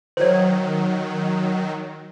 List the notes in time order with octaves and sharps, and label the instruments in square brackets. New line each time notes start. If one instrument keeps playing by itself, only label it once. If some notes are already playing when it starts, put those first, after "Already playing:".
[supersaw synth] D#3 F#3 [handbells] C5 C#5